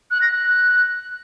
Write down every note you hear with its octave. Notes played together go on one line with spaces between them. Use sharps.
F#6
A#6
F#6